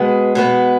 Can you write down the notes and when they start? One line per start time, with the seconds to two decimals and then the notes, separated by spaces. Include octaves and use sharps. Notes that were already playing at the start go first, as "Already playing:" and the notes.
Already playing: B2 G#3 B3
0.35 B2 G#3 B3